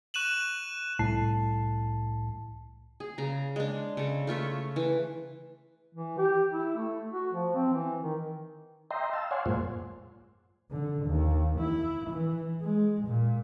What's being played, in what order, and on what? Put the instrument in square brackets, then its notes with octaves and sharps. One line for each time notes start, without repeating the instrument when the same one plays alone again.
[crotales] C#6 F#6 D#7 E7 F#7
[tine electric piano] C2 A2 A5 C7
[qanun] G#4
C#3 A#5
G#3 D4
C#3 A4
A3 F4 C#5 E5
E3
[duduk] E3
G4
E4
A3
F#4
F3
C4
E3
D#3
[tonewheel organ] D#5 E5 G5 A#5 C6
F5 A5 E6
C#5 D5 F5 F#5 G#5 C6
F#2 A2 G#3 A#3 F4 C5
[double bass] D3
D#2
E4
E3
G#3
A#2